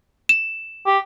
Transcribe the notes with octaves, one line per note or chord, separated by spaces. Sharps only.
E7
G4